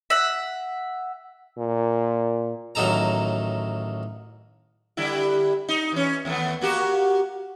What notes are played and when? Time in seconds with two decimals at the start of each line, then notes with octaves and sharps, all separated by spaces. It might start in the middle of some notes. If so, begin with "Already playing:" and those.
0.10 E5 F#5
1.58 A#2
2.75 A1 D#3 F#3 D#4 A4 A#5
4.97 D3 G3 E4
5.69 D#4
5.92 E3 C#4
6.25 D#2 A3 B3
6.61 A#3 F#4 G4